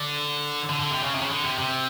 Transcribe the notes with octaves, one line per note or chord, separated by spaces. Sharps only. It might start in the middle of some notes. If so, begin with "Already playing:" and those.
Already playing: D3
D3
D3
C3
C#3
C3
C#3
D3
C3
C3